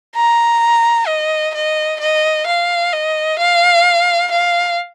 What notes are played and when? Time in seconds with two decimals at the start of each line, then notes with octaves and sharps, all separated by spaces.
0.16 A#5
1.07 D#5
1.54 D#5
2.00 D#5
2.47 F5
2.93 D#5
3.39 F5
4.31 F5